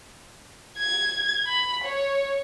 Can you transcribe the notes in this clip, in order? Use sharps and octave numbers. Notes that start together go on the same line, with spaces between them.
G#6
B5
C#5